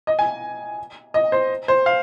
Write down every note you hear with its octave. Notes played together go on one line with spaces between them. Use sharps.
D#5
G#5
D#5
C5
C5
F5